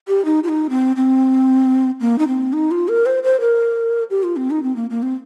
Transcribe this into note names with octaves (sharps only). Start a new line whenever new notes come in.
G4
D#4
F4
D#4
C4
C4
A#3
D#4
C4
D#4
F4
A#4
C5
C5
A#4
G4
F4
C4
D#4
C4
A#3
A#3
C4